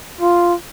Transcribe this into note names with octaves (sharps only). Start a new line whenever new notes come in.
F4